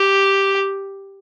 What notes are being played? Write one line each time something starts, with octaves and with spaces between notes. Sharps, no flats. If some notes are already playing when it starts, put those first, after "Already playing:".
Already playing: G4